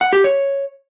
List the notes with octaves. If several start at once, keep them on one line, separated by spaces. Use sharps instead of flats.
F#5
G4
C#5